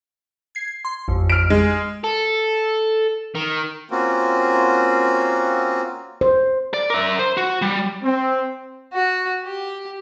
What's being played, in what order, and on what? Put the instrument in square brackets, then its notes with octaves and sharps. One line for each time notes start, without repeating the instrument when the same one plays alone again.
[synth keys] G#6 C7
C6
A1 F2
[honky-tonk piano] F6 D7
G#3
[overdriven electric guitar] A4
D#3
[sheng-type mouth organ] A#3 C4 C#4 F4 F#4
[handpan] C5
[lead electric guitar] D5
A#4 E5
C5
F#4
G3
[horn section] C4
[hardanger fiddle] F#4
G4